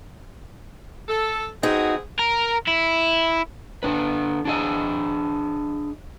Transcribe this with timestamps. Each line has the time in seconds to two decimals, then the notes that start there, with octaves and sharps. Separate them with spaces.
1.09 A4
1.63 B3 C4 D#4 F#4 G#4
2.19 A#4
2.68 E4
3.83 D3 D4 B4
4.45 D4 G#4 D#5